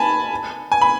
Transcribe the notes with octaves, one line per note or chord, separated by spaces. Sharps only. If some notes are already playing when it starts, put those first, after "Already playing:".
Already playing: G#5 A5 B5
G#5
B5